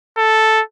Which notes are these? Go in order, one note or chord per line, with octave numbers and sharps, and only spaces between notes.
A4